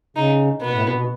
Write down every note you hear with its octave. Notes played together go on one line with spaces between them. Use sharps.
C#3 D#4
B2 B3
A2
B2
B2